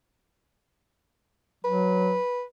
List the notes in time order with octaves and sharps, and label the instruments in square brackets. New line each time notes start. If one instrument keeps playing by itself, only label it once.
[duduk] F#3 [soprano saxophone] B4